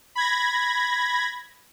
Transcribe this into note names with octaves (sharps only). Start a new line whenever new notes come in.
B5 G#6 A#6